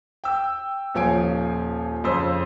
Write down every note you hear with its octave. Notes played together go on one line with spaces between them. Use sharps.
G5 E6
D#1 F3 C#5 G#5 D7
F2 C#3 C5 E6